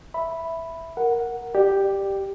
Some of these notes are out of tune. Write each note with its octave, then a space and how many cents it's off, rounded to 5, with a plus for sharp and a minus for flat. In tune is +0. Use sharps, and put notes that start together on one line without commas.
E5 +0 B5 +0
A#4 +0 F#5 +0
G4 +0 D5 +20